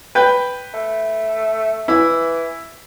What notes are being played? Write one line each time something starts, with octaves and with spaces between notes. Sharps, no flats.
B4 G5
A3
E3 E4